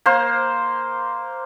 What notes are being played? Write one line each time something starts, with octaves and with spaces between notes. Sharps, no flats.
A#3 C5 C6